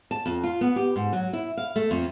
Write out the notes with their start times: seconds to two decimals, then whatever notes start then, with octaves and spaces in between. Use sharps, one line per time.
0.11 A5
0.26 F2
0.44 F4
0.61 B3
0.76 G4
0.96 G#2
1.13 F#3
1.33 E4
1.57 F5
1.76 A3
1.91 F2